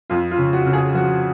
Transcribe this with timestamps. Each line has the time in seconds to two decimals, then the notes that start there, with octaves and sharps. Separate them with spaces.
0.10 F2 F4
0.31 F4
0.38 C#3
0.53 F#4
0.66 C#3
0.73 G#4
0.94 F3 F#4